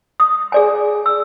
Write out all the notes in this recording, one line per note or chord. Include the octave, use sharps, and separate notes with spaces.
D#6
G#4 D5 G#5
E6